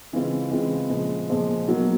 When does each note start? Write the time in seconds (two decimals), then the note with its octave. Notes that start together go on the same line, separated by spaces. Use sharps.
0.12 C#3 E3 G#3 C4 F4
0.51 C#3 E3 G#3 C4 F4
0.90 A#2 F3 G#3
1.29 A#2 F3 G#3
1.68 B2 F#3 A#3